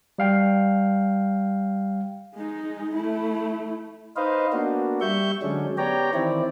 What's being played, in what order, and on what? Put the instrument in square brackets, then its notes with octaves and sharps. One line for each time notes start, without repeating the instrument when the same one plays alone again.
[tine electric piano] G3 F5 G5
[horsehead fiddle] G#3 D#4
A3 E4
[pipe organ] D#4 B4 C5 D#5 F5
A#3 B3 D4 F#4
G3 E5 C#6 G6
D3 F#3 G#3 C#4 D4
B3 G4 C#5 D5 G5 A#5
D#3 E3 C4 E4 D5